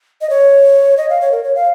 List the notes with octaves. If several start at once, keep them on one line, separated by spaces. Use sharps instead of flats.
D#5
C#5
D#5
F5
C#5
A#4
C#5
F5